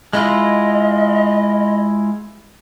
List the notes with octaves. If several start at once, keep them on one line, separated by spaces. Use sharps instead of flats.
G#3 E4 F4 D#5